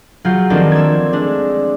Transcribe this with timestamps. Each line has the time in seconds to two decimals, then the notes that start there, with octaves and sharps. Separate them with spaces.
0.25 F#3 F4 G#4 G6 C7
0.50 D#3 F3 A#3 C4 D4 A4
0.72 E6 G#6
1.13 G#3 A3 D4